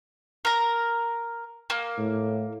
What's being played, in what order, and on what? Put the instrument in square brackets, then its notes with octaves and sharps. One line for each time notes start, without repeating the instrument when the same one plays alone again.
[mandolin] A#4 A#5
A#3
[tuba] A2